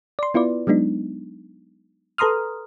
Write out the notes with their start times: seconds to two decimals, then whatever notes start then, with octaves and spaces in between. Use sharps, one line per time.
0.19 D5 C6
0.34 B3 E4 F4 B4 D5
0.67 F#3 G#3 B3 D4 D#4
2.18 A4 B4 A#5 C6 D#6 F6